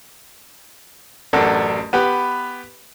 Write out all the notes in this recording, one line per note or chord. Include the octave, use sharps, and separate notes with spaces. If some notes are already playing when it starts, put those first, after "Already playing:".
A1 F#2 D4 A4
B3 G4 B4